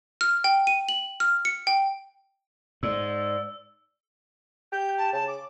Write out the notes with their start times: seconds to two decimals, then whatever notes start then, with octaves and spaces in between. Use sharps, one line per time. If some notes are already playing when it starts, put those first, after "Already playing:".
0.21 F6
0.44 G5
0.67 D#7
0.89 F#7
1.20 F6
1.45 C#7
1.67 G5
2.83 G#2 D5 E6
4.72 G4 G6
4.97 A5
5.13 C#3 A5
5.27 D6